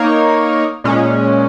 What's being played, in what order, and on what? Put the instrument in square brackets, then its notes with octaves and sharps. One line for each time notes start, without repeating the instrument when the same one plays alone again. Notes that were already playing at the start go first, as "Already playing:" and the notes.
Already playing: [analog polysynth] A#3 D#4 A#4 C#5
A#2 G#3 C#4